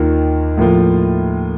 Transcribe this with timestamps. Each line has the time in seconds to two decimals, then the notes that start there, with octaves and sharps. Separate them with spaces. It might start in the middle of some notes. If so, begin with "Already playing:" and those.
Already playing: D#2 D#3 A#3 F4
0.58 A2 F3 A#3 F4